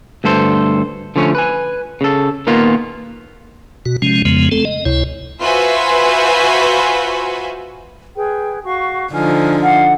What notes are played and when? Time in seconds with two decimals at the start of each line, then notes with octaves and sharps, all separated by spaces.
0.24 D2 G2 A4 C5
1.16 D3 F3 A3 C#4
1.35 B4 G#5
2.01 C#3 A4
2.47 A#2 D#3 A#3 B3 F4
3.86 B2 F#4
4.02 C3 F3 G#3 C#4
4.25 F2 C#3 F3 G#3 B3
4.51 A3 C4 A4
4.65 D#5
4.85 C#2 C3 E4 C#5
5.41 F4 F#4 B4 C5 E5 G#5
8.16 G#4 B4 G5
8.64 F#4 F5 C#6
9.13 D3 F3 D#4 G#5 F6
9.63 F5 F#5 F6